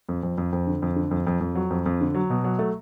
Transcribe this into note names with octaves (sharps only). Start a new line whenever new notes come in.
F2
F2
F2
F2
D3
F2
D3
F2
F2
F2
F#3
F2
F2
D3
F#3
B2
F#3
A3